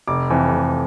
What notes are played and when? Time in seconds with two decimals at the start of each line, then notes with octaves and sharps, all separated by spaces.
0.08 F1 D6
0.30 F2 E3
0.52 F1